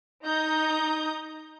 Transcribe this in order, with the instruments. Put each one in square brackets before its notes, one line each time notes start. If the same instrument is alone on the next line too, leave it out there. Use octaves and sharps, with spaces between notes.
[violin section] D#4 A#5 D#6 G6